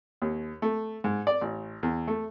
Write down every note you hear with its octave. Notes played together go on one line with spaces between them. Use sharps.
D#2
A3
G#2
D5
A1
E2
A3